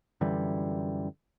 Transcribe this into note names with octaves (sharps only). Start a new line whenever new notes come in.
F#2 D3 E3 G3